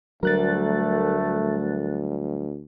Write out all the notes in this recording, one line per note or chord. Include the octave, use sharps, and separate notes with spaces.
D2 F#3 G3 A3 A#4 F#6 A6